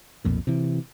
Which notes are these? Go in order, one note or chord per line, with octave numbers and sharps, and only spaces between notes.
B1 F2 A#2
C3 E3